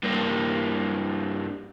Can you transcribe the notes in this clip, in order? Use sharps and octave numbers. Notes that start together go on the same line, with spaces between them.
G2 A#3